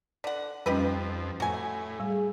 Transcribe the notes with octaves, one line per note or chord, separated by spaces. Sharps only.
D3 D5 F#5
F2 G3 C#4 D#4 G4 B4
A2 F#3 G#5
G3 G#4